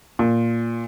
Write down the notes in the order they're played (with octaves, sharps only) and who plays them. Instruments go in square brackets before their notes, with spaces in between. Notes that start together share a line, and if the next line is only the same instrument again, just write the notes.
[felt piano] A#2